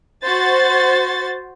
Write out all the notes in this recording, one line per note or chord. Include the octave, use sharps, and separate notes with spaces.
F#4 C5 A6